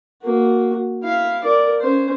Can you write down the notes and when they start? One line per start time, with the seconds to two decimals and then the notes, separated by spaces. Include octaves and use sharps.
0.23 A#3 F#4
1.03 E4 F5
1.44 A#4 D5
1.81 C#4 C5